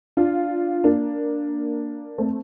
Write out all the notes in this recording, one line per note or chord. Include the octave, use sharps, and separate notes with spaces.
D4 F4
A#3 D4
A3 C4